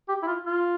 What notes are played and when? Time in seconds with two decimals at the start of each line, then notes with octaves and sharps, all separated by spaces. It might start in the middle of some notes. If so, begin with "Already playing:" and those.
0.08 G4
0.23 E4
0.27 F4
0.46 F4